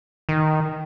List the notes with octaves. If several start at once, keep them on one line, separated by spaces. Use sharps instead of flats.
D#3